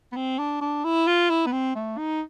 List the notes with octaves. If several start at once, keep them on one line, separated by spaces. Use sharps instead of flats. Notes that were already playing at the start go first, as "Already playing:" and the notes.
B3
C4
D4
D4
E4
F4
E4
B3
C4
A3
D#4